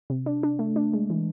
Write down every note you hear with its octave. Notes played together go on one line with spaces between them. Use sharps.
C3
D4
D4
A3
D4
G#3
E3